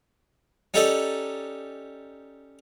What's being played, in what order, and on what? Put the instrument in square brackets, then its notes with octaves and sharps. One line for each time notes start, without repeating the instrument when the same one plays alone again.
[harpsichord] C#4 D#4 G4 A4 D5 D#5